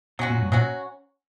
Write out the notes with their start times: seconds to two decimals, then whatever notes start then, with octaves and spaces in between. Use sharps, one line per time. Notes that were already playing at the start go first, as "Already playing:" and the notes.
0.19 B2 F#3 C#4 F#4
0.30 A#2
0.42 G2
0.52 A#2 F#3 C#4 F#4